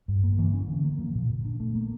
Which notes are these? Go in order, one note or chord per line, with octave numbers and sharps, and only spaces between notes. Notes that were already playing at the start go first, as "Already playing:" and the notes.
G2
A#3
E3
C#4
D3
A#3
F3
A#2
A#2
D4
A3
A#3